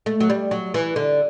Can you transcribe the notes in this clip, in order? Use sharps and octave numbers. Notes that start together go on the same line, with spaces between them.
A3
F#3
G3
F#3
E3
D3